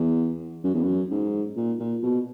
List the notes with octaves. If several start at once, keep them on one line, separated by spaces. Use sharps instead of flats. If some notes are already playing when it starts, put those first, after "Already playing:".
Already playing: E2
F#2
E2
F#2
G#2
A#2
A#2
B2